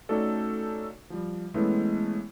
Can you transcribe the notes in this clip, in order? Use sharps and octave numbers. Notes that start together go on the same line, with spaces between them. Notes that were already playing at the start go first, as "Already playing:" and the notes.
A3 C#4 D#4 F#4 A4 D5
F3 G3
E3 G#3 A3 B3 C#4 E4